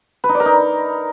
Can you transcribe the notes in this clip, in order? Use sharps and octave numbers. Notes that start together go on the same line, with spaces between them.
B4
D#4
D5
A#4
D#4